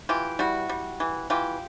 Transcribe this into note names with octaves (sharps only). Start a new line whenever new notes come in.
E3 F4 G4
G3 E4 F#4
G3
E3
E3 F4 G4